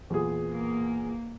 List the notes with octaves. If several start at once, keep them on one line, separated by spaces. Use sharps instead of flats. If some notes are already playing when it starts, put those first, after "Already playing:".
E2 A#2 G#4
A#3